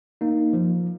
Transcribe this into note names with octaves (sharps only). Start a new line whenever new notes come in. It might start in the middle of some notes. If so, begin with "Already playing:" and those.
A#3 D#4
F3